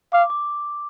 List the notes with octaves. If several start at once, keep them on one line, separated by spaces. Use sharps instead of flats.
F5 D6
D6